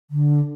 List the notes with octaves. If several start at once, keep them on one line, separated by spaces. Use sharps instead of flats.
D3